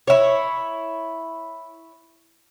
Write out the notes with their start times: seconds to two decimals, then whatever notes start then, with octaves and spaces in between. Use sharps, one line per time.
0.07 E4 C#5